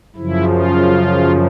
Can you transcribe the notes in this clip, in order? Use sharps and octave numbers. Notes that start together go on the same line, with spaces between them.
F#2 C#3 F3 E4
F4